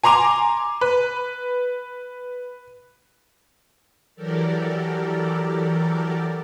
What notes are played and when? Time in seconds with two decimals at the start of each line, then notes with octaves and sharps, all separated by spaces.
0.04 G#5 A#5 C6 D6 F7
0.81 B4
4.16 E3 F#3 G4 A4 A#4 D5